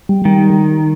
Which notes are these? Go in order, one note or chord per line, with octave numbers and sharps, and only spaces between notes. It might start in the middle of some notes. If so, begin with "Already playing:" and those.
G3
D#3 G3